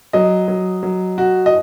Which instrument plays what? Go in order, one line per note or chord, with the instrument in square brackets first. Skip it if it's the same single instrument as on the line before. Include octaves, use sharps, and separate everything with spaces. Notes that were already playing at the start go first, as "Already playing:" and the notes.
[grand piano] F#3 [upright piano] D#5
[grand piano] F#3
F#3
F#4
[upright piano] D#5